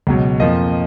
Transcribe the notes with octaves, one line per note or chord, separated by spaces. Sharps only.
C#2 B2 F#3
F2 F3 A#3 D#5